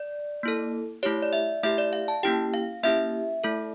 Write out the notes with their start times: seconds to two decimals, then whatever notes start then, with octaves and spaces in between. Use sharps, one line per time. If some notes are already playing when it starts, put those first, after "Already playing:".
Already playing: D5
0.43 A#3 E4 A4
1.03 A3 E4 G4 C#5
1.22 D5
1.33 E5
1.63 A3 E4 G4 E5
1.78 D5
1.93 F5
2.08 A5
2.23 A#3 C#4 E4 G4 G5
2.54 F5
2.83 A#3 C#4 E4 G4 E5
3.44 A3 E4 A4